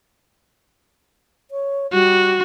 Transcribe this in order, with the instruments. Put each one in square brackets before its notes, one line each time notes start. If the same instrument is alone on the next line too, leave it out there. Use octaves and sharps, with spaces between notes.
[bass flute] C#5
[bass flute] G3 [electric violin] F#4